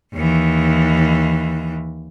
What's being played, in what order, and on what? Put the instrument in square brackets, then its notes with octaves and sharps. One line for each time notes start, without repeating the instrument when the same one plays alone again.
[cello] D#2 E3